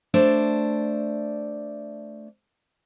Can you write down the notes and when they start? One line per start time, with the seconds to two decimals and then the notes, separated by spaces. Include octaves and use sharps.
0.14 A3 D4 C5 D5